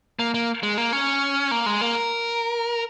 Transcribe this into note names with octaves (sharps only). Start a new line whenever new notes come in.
A#3
A#3
G#3
A#3
C#4
A#3
G#3
A#3
A#4